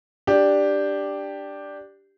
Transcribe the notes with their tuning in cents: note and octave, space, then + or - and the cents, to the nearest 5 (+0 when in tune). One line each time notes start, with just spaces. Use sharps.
D4 +0 G4 +0